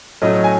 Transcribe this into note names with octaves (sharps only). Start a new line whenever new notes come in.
A2 F#3 A3 C#4 D#5
G#5